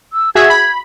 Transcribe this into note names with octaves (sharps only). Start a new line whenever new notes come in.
E6
F#4 G#4 E5 G#6
B5